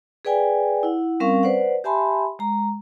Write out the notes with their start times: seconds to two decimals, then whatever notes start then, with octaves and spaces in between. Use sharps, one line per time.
0.25 G#4 B4 D5 G5 G#5
0.83 E4 F#5
1.20 G3 C4 C#4 A#4 F5 C#6
1.43 B4 C5 D5 F#5
1.84 G4 E5 G#5 A5 B5 C6
2.39 G#3 A#5